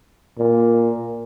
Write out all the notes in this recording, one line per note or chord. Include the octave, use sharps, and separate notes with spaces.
A#2